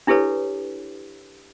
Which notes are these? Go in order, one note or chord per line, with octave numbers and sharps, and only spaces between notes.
D4 E4 G4 A4 B4 C#5